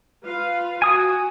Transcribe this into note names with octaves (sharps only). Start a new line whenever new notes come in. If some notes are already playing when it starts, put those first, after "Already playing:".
F4 B4 F5
F#4 G#5 D#6